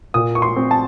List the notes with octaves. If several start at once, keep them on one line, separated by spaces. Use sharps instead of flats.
A#2 D#6
C#6
C6
C4
A5